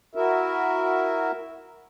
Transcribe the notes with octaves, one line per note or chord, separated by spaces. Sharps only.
E4 F#4 A#4 E5